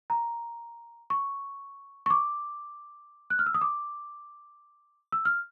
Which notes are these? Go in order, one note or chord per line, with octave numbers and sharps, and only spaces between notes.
A#5
C#6
C#6
D6
F#6
F6
E6
D#6
D6
E6
F6